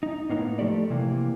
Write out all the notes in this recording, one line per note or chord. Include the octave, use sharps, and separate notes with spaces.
D#4
A2 A#3 B3 D#4
F3 A3 G4 A4 D5
C3 E3 A#3